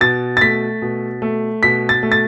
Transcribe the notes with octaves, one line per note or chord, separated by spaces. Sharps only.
B2 A6
A6
A3 B6
B2
A3
B2 B6
A6
A3
A6